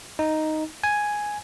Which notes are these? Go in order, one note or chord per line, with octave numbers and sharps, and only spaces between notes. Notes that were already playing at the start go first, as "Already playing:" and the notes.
D#4
G#5